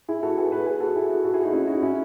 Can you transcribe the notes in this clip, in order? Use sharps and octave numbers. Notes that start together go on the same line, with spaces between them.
E4 G#4
F#4 A4
G#4 B4
G#4 B4
G#4 B4
F#4 A4
E4 G#4
F#4 A4
F#4 A4
E4 G#4
D#4 F#4
C#4 E4
D#4 F#4
C#4 E4